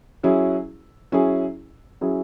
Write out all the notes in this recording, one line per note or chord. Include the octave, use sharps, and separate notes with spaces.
F#3 C#4 E4 G#4
F#3 C#4 E4 G#4
F#3 C#4 E4 G#4